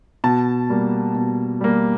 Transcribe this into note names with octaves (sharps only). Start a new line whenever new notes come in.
B2 A5
G3 A#3
B2
G3 A#3